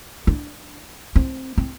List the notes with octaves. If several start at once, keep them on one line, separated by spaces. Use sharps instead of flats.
D4
C4
C4